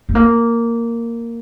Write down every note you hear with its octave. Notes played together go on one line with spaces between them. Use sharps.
A3
A#3